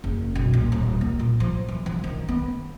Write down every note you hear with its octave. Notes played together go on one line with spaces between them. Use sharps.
F#1
B1
A#2
D#1
A#3
A#2
F3
E3
F3
D#3
B3